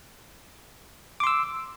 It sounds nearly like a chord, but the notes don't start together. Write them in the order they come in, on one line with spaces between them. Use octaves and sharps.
D6 C6 E6